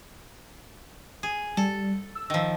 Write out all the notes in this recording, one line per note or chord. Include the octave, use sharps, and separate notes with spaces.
G#4
G3 A4
E6
D#3 F3